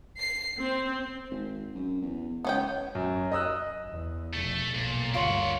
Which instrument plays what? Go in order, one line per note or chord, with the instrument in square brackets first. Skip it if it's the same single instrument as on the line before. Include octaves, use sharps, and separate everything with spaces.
[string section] C7
C4
[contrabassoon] G#1
F#2
E2
[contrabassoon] C#2 [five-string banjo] B3 C#4 G5
[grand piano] F#2
D#5 D#6 E6 F#6
[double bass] E2
[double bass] F1 B2 [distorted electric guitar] A3
[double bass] B1 [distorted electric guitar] A#2
[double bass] G1 D2 [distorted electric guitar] A#3 F#5 [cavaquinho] F4 C#5 C6